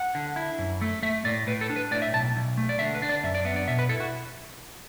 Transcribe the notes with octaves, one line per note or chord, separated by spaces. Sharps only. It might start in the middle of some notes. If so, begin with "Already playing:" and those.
Already playing: F#5
D3
E4
F#2
A3
A3 E5
A2 D5
A2 B4
A4
D4
B4
A2 D5
E5
B1 A5
B1
A3
D5
D3 E5
B4
D4
D5
F#2 E5
D5
B3 E5
D5
B2 E5
B4
E4 A4
F#4